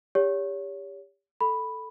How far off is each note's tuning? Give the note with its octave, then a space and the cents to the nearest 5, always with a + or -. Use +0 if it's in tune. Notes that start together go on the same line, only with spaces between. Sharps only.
G4 +25 C#5 +30
A4 +0 B5 +0